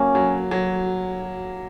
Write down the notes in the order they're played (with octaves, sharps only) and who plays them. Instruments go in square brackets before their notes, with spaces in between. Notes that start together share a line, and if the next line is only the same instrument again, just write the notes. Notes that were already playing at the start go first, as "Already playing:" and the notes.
Already playing: [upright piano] F#3 A#3 [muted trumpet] C#4
[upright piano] F#3
F#3